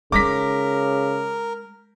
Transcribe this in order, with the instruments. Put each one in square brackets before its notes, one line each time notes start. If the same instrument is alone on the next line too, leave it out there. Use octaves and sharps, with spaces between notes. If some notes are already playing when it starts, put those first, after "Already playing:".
[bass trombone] C#3 [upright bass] G#3 D#4 [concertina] A#4 [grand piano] D6 A#6 B6